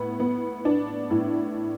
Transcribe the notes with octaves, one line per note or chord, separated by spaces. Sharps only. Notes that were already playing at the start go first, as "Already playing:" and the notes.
Already playing: A2 B3
B3
D4
A2